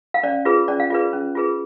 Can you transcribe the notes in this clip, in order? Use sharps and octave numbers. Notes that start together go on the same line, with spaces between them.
F5
C#4 D5
F4 G#4 B4
C#4 D5
F5
F4 G#4 B4 D5
C#4
F4 G#4 B4